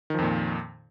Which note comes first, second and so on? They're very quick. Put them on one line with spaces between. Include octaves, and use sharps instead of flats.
D#3 F3 F2 A#2